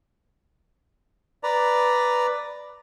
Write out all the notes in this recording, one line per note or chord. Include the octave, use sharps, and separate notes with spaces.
B4 D5 A#5